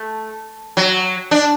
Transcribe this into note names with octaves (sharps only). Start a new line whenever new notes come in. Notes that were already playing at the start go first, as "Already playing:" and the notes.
Already playing: A3
F#3
D4